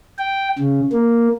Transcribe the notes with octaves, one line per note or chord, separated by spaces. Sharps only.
G5
C#3
A#3